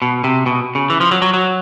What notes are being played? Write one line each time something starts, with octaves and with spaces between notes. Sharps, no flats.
B2
C3
B2
C#3
E3
F3
F#3
F#3
F#3